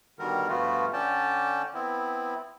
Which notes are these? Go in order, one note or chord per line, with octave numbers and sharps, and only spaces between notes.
B2 D3 D#3 G3 A#4
G2 F3 A3 B3 F4 F#4
D3 C#4 D5 G5 A5
B3 C4 E4